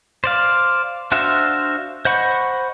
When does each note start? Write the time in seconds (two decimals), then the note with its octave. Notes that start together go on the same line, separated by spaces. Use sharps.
0.24 C5 D5 F5
1.12 D4 F#4 C5 E5 F5
2.05 C5 D#5 F#5 B5 C#6